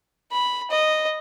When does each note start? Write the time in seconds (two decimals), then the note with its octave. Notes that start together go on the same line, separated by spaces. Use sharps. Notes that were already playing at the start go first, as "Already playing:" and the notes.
0.31 B5
0.71 D#5